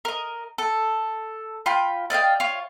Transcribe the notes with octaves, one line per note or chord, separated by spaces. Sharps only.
A#4 D#5
A4
F4 G5 B5
D5 D#5 F5 G5
F4 C#5